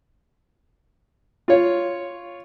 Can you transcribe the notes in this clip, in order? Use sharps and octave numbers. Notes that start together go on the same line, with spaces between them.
F4 C#5